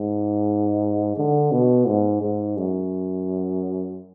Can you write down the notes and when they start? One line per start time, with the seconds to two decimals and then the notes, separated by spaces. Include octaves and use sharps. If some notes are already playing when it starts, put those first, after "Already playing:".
Already playing: G#2
1.17 D3
1.52 B2
1.87 G#2
2.22 G#2
2.57 F#2